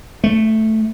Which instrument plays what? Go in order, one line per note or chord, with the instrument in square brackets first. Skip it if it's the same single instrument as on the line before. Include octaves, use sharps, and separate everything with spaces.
[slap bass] A3